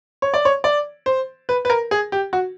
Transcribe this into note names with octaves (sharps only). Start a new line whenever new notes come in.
C#5
D5
C#5
D5
C5
B4
B4
A#4
G#4
G4
F#4